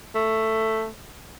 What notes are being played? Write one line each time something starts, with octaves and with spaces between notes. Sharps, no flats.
A3